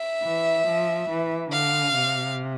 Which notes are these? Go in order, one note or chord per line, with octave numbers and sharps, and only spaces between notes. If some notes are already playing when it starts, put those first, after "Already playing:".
Already playing: E5
E3
F3
E3
D3 F5
C3